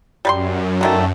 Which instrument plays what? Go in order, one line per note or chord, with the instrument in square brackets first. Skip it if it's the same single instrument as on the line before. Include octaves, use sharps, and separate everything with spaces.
[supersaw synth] F#2 [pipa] G3 B4 C6
[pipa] D3 D#3 A3